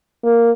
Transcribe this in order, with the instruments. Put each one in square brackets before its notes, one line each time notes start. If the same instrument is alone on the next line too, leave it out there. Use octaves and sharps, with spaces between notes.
[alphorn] A#3